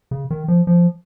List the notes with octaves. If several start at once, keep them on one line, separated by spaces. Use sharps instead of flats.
C#3
D#3
F3
F3